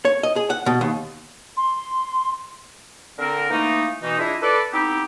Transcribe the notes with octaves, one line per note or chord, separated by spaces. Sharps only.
C#5
D#5
G#4
F#5
B2
D#2
C6
D3 C4 A#4
E3 A3 A#3 D#4
B2 E3 D#4
D4 E4 F4 G#4 D#5 E5
A4 B4 D5
B3 C4 D#4 E4 G4